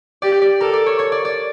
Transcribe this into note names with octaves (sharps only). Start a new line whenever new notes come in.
G4 D5
D5
A4 A#4
D5
C#5
C#5
D5
D5